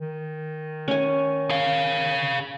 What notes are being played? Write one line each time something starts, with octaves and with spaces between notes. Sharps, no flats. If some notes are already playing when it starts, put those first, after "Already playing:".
D#3
C#4 G#5
G#4 F5